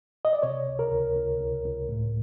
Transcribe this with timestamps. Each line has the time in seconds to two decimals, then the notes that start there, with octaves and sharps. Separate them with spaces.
0.25 D#5
0.33 D5
0.43 C3 C#5
0.67 C#2
0.79 A#4
0.92 C#2
1.16 C#2
1.40 C#2
1.64 C#2
1.89 A2